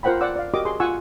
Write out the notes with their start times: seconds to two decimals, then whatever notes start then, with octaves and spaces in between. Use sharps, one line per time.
0.03 F4 A#4 C5 F#5 G5 B5
0.21 D5 F#5 D6 E6
0.36 D5 F5
0.54 F#4 G4 A#4 D#5 D6
0.65 G#4 C6
0.80 F4 F#5 G#5 C#6 E6